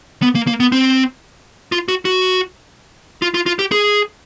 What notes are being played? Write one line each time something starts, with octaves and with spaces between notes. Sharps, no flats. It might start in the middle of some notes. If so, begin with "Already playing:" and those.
B3
A#3
A#3
B3
C4
F4
F#4
F#4
F4
F4
F4
G4
G#4